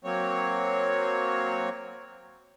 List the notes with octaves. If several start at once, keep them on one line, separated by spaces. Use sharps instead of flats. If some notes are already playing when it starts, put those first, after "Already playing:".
F#3 A#3 C4 C#5